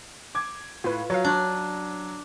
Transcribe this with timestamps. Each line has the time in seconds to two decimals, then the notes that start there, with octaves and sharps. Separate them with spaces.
0.35 D6 G#6
0.84 A2 F4 B4
1.10 F#3 C#5 F5
1.24 D4 C#5